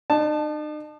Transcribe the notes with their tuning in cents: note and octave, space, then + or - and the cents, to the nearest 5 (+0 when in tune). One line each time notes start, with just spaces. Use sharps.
D#4 -45 A5 +0